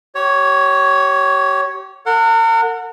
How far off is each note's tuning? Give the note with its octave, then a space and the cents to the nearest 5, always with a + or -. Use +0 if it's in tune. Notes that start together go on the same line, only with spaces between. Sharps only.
G4 -35 C#5 +0
A#4 -40 F#5 -20